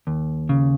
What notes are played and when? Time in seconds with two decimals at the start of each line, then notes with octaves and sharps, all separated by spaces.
0.07 D#2
0.49 C#3